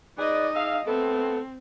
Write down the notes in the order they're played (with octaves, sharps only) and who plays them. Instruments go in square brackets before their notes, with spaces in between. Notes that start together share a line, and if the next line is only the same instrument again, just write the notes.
[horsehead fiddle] D#4 D#5 [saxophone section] G#4 B4 D5
[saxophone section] G#4 E5 F5
[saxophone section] A3 B3 A4 [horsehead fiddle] C4